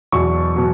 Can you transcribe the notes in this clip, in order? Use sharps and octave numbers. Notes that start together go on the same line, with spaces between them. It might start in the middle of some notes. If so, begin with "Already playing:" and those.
E2 B2 F#3 C#6
B2 F#3